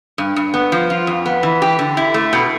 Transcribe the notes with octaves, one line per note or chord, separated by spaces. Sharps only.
G2
G2
B3
F3
F4
F2
B3
E3
G4
D3
E4
A3
B2